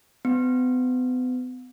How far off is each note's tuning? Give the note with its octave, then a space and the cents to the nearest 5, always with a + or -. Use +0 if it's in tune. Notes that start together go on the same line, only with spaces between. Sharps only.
B3 +40